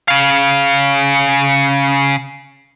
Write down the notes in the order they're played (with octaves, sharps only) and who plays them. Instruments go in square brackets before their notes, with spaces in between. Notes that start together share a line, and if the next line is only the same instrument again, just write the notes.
[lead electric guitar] C#3 F5